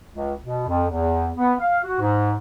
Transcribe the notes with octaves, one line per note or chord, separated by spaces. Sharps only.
C#2
B2
F2
E2
B3
F5
F#4
G#2